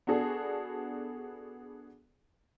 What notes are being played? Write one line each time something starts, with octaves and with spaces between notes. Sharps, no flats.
B3 D4 F#4 G#4 A4